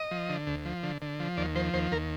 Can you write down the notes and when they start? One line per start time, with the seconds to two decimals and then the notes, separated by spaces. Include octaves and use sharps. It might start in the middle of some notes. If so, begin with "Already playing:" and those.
Already playing: D#5
0.11 F3
0.29 D3
0.47 D2
0.65 F3
0.83 D3
1.02 D3
1.20 F3
1.37 D#2 D5
1.55 F3 C5
1.74 D#2 C5
1.92 D#2 A#4